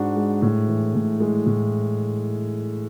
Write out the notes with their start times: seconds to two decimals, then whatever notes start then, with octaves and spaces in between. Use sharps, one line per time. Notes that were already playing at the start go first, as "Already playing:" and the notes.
Already playing: G#2 G#3 D4 F#4
0.16 G#3
0.42 A2
0.68 E3
0.95 A2
1.20 G#3
1.46 A2